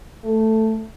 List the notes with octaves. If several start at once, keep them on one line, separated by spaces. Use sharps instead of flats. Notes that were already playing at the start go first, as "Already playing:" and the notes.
A3